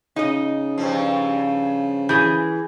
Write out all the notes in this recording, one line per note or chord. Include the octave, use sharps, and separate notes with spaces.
C#3 D#4 D#5
G2 F3
E3 G#4 G6